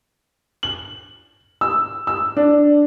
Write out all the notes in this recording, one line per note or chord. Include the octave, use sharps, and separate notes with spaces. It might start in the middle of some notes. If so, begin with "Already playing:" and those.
F#7
E6
E6
D4